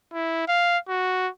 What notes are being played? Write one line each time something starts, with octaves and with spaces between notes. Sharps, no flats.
E4
F5
F#4